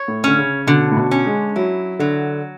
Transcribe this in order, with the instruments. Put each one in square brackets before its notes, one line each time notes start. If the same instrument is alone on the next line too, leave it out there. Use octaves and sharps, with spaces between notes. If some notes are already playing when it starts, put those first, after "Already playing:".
Already playing: [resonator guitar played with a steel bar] C#5
[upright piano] A2
[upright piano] D3 [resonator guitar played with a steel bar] C#4
[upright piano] C#3
[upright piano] B2 [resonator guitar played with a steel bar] D3
[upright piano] A2
B2
[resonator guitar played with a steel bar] C#4
[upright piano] G#3
[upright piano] F#3 [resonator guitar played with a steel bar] E4
[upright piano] D3 [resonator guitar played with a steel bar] F#3